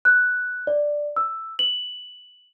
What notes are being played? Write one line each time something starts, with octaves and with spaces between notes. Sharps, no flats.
F#6
D5
E6
F#7